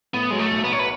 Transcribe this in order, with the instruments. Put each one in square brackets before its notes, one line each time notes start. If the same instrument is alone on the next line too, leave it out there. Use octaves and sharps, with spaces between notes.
[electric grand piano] A2 [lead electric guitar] B3
[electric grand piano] F#3 [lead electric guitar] G#3
[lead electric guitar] A3
[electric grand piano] B1
[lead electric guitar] B3
[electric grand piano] B1 [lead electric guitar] C#5
[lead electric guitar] B4